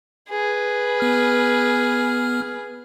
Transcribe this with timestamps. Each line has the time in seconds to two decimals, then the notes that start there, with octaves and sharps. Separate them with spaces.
0.29 G#4 B4
1.00 B3 F6